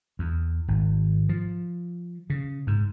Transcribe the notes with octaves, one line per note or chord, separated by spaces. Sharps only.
E2
G#1
F3
C#3
G#2